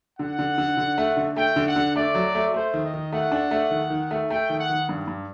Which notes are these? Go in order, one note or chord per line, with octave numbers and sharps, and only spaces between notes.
D3 F#5
D3
D3
D3
A3
D3
A3 G5
D3
F#5
D3
A3 D5
F#3
A3
A3 C5
D#3
D#5
D#3
A3 F#5
D4
A3
D#3
D#3
A3
A3 G5
D#3
F#5
D#3
G2
G2